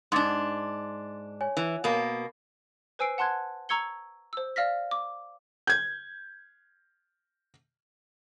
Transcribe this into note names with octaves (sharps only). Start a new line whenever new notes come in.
G#2 D4 C6 D6 A6
C#5 G#5
E3
B2 A#3
B4 C5 G#5 E6 C7 D7
F#5 A5 C6 F#6 G#6
A#5 C#6 E6 G#6 C#7 G7
C5 E6
D5 F5 F6 A#6 B6
D6
G6 G#6